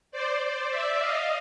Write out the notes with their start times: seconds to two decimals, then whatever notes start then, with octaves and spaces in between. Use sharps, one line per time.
0.11 C5 D5
0.41 C5 D5
0.70 D5 E5
1.00 D#5 F5